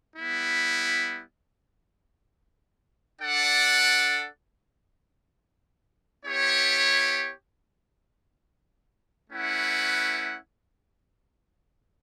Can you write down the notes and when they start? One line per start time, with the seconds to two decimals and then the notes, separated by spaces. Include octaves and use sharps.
0.15 G3 B3 E4
3.20 D4 A4 D5 F#5
6.25 B3 E4 G4 C#5
9.30 A3 C#4 E4 B4 F#5